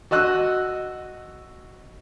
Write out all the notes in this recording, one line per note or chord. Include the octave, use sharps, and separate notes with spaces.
F#4 D#5 E6 F#6